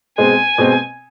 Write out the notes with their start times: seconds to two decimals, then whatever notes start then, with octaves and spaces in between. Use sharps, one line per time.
0.18 B2 G#3 C4 G#5
0.58 B2 G#3 C4